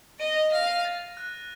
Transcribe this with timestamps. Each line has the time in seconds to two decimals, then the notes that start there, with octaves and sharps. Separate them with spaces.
0.19 D#5 D#7
0.36 F7
0.52 F5 A#6
0.69 A#6
0.85 A6
1.17 F#6